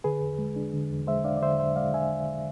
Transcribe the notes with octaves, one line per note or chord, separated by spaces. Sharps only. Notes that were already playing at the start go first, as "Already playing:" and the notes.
D3 G#4 B4
E2
G#3
D4
D3
E2
G#3 C5 E5
D4 D5 F5
D5
D3 C5 E5
E2 C5 E5
G#3 D5 F5
D4 E5 G#5